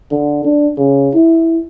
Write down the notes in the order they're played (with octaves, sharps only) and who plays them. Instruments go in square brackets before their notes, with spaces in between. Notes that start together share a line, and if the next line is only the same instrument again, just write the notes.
[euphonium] D3
D4
C#3
E4